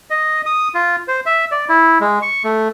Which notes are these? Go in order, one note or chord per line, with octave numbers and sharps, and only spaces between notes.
D#5
D#6
F4
C5
E5
D5
E4
G#3
C#6
A3